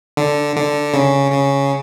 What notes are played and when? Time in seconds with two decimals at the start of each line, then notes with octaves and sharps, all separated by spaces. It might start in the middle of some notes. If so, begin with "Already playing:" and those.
0.17 D3
0.56 D3
0.94 C#3
1.32 C#3